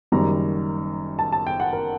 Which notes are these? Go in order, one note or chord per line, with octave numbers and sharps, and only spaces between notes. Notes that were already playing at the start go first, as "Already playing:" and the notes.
F#1 F#2 D#3 G3 A#5
A5
A5
G5
F#5
A#4